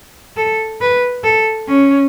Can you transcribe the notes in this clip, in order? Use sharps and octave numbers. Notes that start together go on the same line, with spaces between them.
A4
B4
A4
C#4